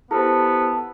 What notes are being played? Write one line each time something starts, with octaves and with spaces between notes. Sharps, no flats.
B3 E4 G4 A4 C5